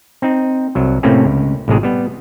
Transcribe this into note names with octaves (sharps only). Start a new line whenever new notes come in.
C4 D#4
C2 F#3
A2 C3 A3 A#3 C4 C#4
C#2
A1 A2 C3 G#3 G#4
G3 B3